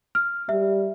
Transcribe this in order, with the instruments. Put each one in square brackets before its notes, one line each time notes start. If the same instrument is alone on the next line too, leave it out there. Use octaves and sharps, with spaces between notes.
[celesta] F6
[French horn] G3 [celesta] E5